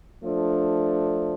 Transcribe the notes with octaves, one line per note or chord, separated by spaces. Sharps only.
F3 A3 D4